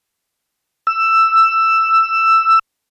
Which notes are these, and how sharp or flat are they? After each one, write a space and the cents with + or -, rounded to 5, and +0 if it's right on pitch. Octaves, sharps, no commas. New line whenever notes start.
E6 +10